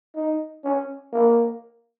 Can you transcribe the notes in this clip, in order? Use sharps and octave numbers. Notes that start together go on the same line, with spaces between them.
D#4
C#4
A#3